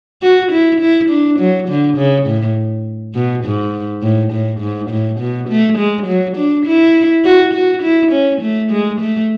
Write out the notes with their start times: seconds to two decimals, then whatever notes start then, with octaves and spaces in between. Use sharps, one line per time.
0.22 F#4
0.52 E4
0.81 E4
1.10 D4
1.39 F#3
1.68 D3
1.97 C#3
2.26 A2
3.15 B2
3.44 G#2
4.03 A2
4.32 A2
4.61 G#2
4.90 A2
5.20 B2
5.49 A3
5.78 G#3
6.07 F#3
6.37 D4
6.66 E4
7.25 F#4
7.54 F#4
7.83 E4
8.12 C#4
8.41 A3
8.71 G#3
9.00 A3